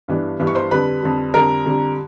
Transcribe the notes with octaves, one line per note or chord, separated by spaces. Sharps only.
G2 E3 G3 B3 D4
G2 E3 G3 B3 D4
C#6
C5 C6
F2 D3 G3 B4 B5
F2 D3 G3
F2 D3 G3 A#4 A#5
F2 D3 G3